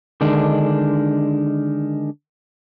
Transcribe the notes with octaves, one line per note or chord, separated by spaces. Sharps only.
D3 D#3 G#3 D4